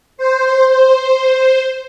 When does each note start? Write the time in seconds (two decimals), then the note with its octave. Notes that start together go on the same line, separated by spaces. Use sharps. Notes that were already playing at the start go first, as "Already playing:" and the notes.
0.17 C5
0.68 C5